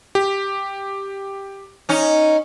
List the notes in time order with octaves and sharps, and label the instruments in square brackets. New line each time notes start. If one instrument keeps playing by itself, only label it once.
[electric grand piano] G4
[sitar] C#4 D#4